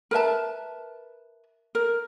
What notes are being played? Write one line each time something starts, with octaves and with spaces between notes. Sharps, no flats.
A#4 B4 E5 A5
A#4